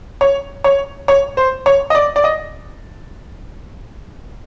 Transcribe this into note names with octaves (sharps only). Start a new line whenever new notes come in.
C#5
C#5
C#5
C5
C#5
D#5
D5
D5
D#5